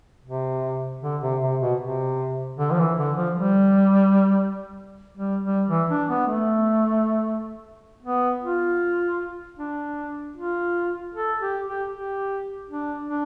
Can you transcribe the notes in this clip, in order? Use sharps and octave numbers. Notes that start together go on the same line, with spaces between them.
C3
D3
C3
C3
B2
C3
D3
F3
E3
D3
F3
G3
G3
G3
E3
D4
B3
A3
B3
F4
D4
F4
A4
G4
G4
G4
D4
D4